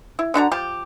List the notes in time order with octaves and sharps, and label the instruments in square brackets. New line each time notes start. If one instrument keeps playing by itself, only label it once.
[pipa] E4
D3 D4 F#4 A#5
F3 G4